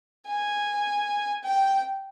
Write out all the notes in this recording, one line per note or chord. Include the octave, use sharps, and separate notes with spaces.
G#5
G5